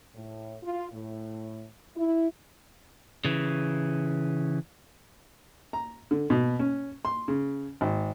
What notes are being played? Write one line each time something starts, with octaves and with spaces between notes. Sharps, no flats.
A2
F4
A2
E4
C#3 E3
A#5
D3
B2
C#4
C6
C#3
G#1